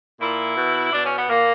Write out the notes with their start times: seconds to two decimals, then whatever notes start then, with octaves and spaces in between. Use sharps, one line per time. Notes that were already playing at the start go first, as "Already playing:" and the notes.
0.20 A#2 E4
0.57 B2
0.92 B2 D4
1.05 C#4
1.16 B3
1.28 A#2 A#3